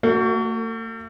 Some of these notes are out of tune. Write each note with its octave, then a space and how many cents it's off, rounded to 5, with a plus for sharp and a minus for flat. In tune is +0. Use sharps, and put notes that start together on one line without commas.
A3 +45 F#4 +0